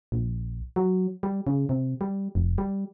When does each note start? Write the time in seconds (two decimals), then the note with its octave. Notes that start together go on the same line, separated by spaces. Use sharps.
0.12 A#1
0.76 F#3
1.23 G3
1.47 C#3
1.69 C3
2.01 G3
2.35 F1
2.58 G3